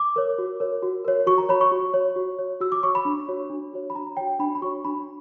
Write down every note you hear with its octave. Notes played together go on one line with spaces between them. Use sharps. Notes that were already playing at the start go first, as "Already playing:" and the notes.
Already playing: D6
A#4 C#5
F#4
A#4 C#5
F#4
A#4 C#5
F#4 C#6
A#5
C#5 B5
C#6
F#4
C#5
F#4
C#5
F#4 E6
D6
C#5 C#6
B5
D4
F#4 C#5
D4
F#4 C#5
B5
D4 A#5
F#4 C#5 G5
D4 B5
B5
F#4 C#5 C#6
D4 B5